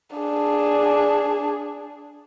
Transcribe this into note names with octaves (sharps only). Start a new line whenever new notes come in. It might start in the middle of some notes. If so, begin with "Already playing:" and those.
D4 G#4